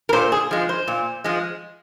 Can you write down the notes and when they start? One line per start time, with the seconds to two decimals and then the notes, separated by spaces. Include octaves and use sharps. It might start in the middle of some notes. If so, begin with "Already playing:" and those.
0.09 A#4
0.13 A#2 C5
0.32 G#4
0.51 F3 G#3
0.69 C5
0.88 A#2
1.24 F3 G#3